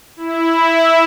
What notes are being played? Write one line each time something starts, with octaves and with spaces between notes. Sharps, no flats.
E4